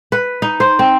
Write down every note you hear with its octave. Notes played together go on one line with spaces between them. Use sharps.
B4
D#4
C5
C4